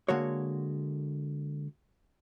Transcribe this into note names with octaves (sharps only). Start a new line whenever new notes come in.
D3 G#3 A#3 F#4 C#5